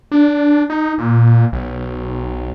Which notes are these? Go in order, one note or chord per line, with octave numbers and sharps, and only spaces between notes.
D4
D#4
A#2
B1